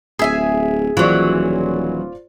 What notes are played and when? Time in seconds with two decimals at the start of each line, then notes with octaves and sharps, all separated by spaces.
0.19 D1 G#4 E5 G#5
0.97 D#1 E3 F#3 F4 C5 D5